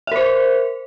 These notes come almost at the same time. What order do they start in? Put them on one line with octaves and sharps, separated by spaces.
E5 A#4 C5